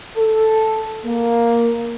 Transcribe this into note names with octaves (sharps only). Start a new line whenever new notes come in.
A4
A#3